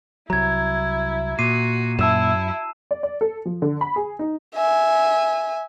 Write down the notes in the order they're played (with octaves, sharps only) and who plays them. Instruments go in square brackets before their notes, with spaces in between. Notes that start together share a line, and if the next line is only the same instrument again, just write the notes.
[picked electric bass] C2 F#3 [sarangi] E4 [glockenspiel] A#5 G#6
[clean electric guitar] A#2 [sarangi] F#4 [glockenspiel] C7 D#7
[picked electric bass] F#2 [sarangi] E4 [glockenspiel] A5 E6 E7
[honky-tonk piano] D5
D5
A4
F3
D3
B5
G#4
D#4
[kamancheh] E5 G#5